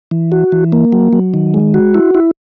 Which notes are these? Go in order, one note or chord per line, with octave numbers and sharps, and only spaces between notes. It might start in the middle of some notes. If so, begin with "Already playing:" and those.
E3
F#4
E3
A#3
F#3
F#3
D#3
G#3
F#4
E4
E4